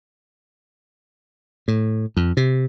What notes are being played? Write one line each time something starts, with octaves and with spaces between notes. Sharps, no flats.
A2
F2
C3